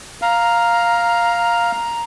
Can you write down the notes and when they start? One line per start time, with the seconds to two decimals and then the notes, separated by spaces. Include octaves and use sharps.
0.22 F5 A#5